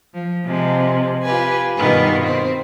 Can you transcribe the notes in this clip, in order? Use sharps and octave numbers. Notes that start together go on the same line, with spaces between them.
F3
C3 F3 G#3
F4 G4 B4 G#5
G2 B2 D#3 B3 F4
C4